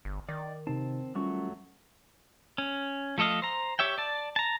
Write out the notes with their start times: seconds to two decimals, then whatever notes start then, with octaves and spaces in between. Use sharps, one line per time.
0.05 G1
0.29 D#3 D5
0.67 C3 C4 D#4 A5
1.15 F#3 G3 A3 C#4 F4 C#6
2.58 C#4
3.18 F3 A3 A4 D#5 F5
3.42 C5 A#5
3.79 G4 C#5 E5 G5
3.98 D5 A5
4.36 A5 A#5